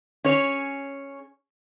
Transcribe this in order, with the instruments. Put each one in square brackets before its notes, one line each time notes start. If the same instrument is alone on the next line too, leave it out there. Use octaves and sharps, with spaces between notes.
[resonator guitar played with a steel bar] C#4 G#4 C#5